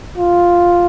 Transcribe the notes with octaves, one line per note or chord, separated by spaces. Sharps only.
F4